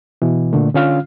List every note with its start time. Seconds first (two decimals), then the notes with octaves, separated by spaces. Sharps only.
0.22 B2 E3
0.53 A#2 D3 A3
0.74 D3 C#4 F4 F5 F6